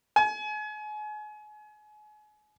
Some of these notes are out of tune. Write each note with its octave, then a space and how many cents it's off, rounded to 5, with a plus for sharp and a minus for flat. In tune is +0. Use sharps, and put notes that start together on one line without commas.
G#5 +35